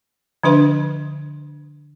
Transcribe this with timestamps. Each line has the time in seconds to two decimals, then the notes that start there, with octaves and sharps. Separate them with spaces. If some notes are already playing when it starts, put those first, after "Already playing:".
0.43 D3 F3 D4 B4 E5